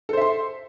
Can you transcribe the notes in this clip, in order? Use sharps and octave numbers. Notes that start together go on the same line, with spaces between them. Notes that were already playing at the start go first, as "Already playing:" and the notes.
A4 C5 E5 C6